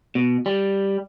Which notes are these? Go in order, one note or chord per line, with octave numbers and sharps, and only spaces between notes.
B2
G3